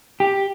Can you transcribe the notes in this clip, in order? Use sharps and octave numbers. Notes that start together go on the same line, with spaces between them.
G4